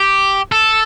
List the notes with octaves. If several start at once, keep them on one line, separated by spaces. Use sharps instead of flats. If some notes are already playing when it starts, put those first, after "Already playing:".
Already playing: G4
A4